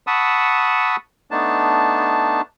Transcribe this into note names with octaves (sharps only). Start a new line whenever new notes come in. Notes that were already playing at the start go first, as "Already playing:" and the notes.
F#5 A5 B5 C#6 D#6 E6
A3 B3 D4 D#4 A5